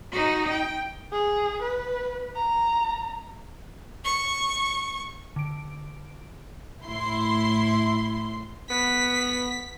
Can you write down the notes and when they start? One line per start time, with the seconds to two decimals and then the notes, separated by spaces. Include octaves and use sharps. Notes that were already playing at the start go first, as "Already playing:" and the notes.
0.12 D#4 F#4
0.50 G5
1.12 G#4
1.62 B4
2.36 A#5
4.04 C#6
5.36 D3 D7
6.85 A2 E4 C6
8.70 B3 B6